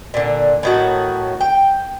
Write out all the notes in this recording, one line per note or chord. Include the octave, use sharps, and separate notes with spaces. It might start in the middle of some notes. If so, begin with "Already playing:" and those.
A#2 D3
A2 D#3 F#4
G5